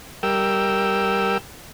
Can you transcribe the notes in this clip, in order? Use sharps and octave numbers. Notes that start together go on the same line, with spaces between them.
G3 A#4 G5 E6